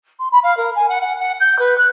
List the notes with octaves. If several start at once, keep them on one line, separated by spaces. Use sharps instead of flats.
C6
B5
F5
A#4
G#5
F#5
F#5
F#5
G6
B4
F#6